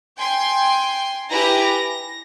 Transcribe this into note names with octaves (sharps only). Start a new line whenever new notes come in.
G5 G#5 C6
E4 G4 B4 G#5 A#5 A#6
A#6